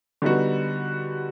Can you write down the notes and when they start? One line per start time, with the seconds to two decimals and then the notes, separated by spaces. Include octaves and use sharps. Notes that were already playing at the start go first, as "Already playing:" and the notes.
0.22 D3 G3 B3 D#4 F#4